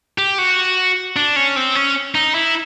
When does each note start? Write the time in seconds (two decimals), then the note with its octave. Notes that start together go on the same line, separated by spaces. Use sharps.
0.18 G4
0.38 F#4
1.16 D4
1.36 C#4
1.56 C4
1.75 C#4
2.15 D#4
2.35 E4